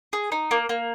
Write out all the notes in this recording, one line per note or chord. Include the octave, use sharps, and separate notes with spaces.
G#4
D#4
A#3
A#3